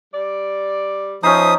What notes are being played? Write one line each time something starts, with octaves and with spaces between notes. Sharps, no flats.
G3 D5
F3 C#4 D#4 B4 C5 E5 D#6